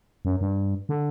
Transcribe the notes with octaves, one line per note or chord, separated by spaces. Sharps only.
F#2
G2
D3